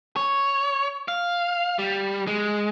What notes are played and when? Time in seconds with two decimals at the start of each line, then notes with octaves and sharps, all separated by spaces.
0.16 C#5
1.08 F5
1.79 G3
2.27 G#3